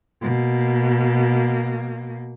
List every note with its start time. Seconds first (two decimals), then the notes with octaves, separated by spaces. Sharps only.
0.22 B2 A#3